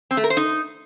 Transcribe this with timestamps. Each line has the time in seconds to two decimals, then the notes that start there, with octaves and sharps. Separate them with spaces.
0.11 C4
0.17 A3
0.24 A#4
0.30 C5
0.37 D#4